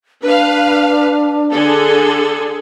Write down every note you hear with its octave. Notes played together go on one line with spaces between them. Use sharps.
D4 B4 F5
D3 G#4 A4